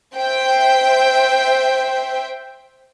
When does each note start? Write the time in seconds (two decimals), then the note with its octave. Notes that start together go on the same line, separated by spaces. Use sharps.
0.17 C5 E5 G5